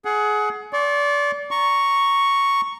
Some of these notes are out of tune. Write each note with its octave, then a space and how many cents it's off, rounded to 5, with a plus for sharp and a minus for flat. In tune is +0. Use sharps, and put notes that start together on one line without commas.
G#4 +25 F#5 +5
D5 -25 C6 +40
A#5 +0 C#6 +0